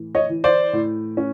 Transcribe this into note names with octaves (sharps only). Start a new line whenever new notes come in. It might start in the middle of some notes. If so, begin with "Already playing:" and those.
Already playing: A2 E3
C#5 D#5
E3
C5 D5
A2
C#4